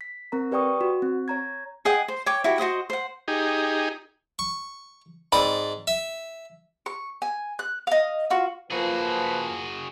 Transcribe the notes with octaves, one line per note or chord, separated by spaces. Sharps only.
B6
C4 A#4 A#5
G4 B4 D5 G5 C#6 D#6
F#4
C4
C#5 A#5 G#6
G#4 D#5 F#5 G5
C5
C#5 G5 D6
E4 F#4 G4
F#4 C5 D#5 F#5
C5 F#5
D#4 G4 G#4
C#6
G#2 C4 D5 B5 D#6
E5
C#6
G#5
F#6
D#5 F5
F4 F#4
F3 A#3 F#4 G#4 B4